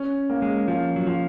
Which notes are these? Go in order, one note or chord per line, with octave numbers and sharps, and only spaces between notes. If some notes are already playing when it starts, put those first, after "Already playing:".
Already playing: C#4
A#3
G#3
F3 F4
F#3
F3 F4